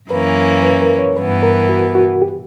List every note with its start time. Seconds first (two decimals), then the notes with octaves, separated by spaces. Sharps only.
0.10 F#2 E3 A#3 C#4 B4
0.63 B4
0.82 A#4
0.99 C#5
1.16 G2 E3 B3 B4
1.43 A#4
1.69 F#4
1.95 F#4
2.22 G4